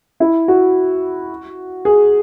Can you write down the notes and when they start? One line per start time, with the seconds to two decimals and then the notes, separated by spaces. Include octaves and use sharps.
0.20 E4
0.48 F#4
1.85 G#4